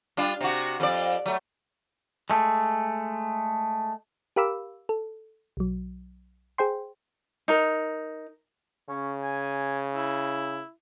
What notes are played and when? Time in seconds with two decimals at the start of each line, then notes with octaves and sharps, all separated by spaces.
0.17 G3 D4 F4
0.41 C3 F#4
0.80 F2 D5
1.26 F#3 A3
2.30 G#3 A3
4.36 G4 A#4 F5 B5 D6 E6
4.89 A4
5.57 B1 F#3
6.58 G#4 C5 G5 C6
7.48 D#4 A#4
8.89 C#3 C#4
9.24 G#5
9.94 E4